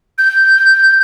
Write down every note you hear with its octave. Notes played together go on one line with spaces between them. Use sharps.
G6